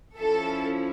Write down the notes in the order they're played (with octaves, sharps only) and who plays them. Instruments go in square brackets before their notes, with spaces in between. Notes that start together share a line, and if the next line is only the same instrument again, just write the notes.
[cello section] F3 C#4 E4 [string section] A4